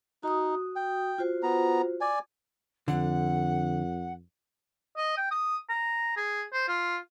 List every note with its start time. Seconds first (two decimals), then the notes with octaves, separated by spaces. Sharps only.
0.23 D#4 F#4 D#6
0.76 G5
1.18 F4 F#4 C5
1.43 B3 A#5
2.01 D5 G#5
2.88 F2 D3 F#5
4.97 D#5
5.17 G5
5.31 D#6
5.69 A#5
6.17 G#4
6.53 C5
6.68 F4